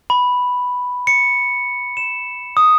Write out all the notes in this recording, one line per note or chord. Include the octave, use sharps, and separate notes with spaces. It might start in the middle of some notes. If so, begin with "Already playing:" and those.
B5
C#7
E7
D#6